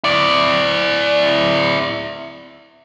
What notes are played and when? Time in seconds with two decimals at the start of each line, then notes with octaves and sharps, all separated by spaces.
0.04 E4 D5